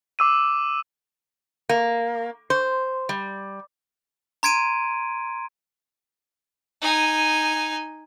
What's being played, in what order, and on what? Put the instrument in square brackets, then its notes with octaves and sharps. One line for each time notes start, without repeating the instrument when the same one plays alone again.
[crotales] D6 E6 D#7
[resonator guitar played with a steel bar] A#3
C5
G3
[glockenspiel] A#5 C6 G#6 D7 D#7
[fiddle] D#4 G#5